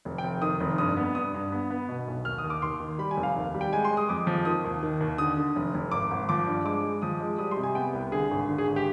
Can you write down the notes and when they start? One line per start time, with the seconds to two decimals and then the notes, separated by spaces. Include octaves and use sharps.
0.05 F1
0.18 G5
0.24 F1
0.42 D#3 D#6
0.60 F1
0.78 G2 D#6
0.97 B3
1.15 G2 D#6
1.34 G2
1.52 B3
1.70 B3
1.89 B2
2.08 B1
2.25 D#2 F6
2.38 D#6
2.44 D#2
2.50 D6
2.62 D#2 C6
2.80 D#3
2.98 G3 B5
3.11 G#5
3.17 F1
3.23 F5
3.36 D#2
3.54 G3
3.61 G5
3.73 G#3 G#5
3.85 C6
3.91 G#3
3.97 D#6
4.09 F2 D6
4.27 F3
4.45 D#3 D#6
4.64 D#2
4.83 D#3
5.01 D#2
5.18 D3 D#6
5.37 D3
5.56 F1
5.74 F1
5.92 G#1 D6
6.11 G#1
6.29 F3 D6
6.47 G2
6.65 G#3 D6
6.83 G#3
7.02 F3 D#6
7.20 G#3
7.38 G3 D#6
7.51 C6
7.57 C3
7.63 G#5
7.75 B3 G5
7.93 C2
8.12 D3 G#4
8.31 G#1
8.49 D3
8.58 G#4
8.67 G#1
8.76 G4